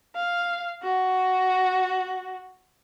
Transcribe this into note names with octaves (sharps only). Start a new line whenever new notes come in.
F5
F#4